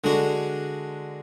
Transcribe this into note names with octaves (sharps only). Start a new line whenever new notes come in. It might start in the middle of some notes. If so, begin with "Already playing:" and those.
D3 G#3 D4 F#4